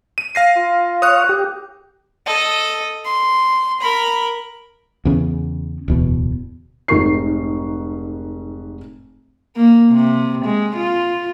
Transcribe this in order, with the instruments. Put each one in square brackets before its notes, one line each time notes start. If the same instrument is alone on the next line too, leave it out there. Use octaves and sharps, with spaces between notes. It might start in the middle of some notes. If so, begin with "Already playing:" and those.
[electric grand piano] D#7
F5 A#6 C7
[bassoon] F4
[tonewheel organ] C#5 F5 [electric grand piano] D#6 F#6
[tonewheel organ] G4
[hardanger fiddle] A4 D#5
C6
A#4 B5
[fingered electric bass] E2 C#3
D1 E2 B2
[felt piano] F1 G#2 A#4 C#6 C7
[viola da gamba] A#3
C3
G#3
F4